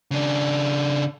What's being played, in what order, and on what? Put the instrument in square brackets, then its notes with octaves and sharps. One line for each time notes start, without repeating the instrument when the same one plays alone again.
[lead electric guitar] C#3 D4